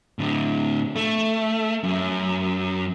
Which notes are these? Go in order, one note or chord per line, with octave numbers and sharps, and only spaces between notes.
A2 D3
A3
F#2